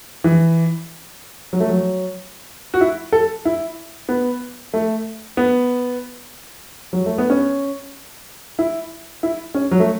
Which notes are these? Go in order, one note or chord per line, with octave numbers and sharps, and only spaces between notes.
E3
F#3
A3
F#3
F#4
E4
A4
E4
B3
A3
B3
F#3
A3
B3
C#4
E4
E4
C#4
F#3
A3